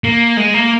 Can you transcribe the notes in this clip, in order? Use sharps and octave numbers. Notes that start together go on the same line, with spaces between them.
A#3
G#3
A#3